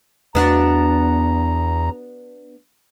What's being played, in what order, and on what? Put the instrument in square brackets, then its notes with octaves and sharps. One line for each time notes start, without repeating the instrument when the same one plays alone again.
[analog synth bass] E2 [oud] B3 D4 F#4 [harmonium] A#5